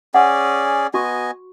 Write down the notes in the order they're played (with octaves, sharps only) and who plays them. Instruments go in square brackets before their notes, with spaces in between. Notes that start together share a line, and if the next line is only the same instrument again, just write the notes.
[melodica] C#4 G#4 D5 [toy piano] F#5
[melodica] B3 D#5 G#5 [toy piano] F#4 C#6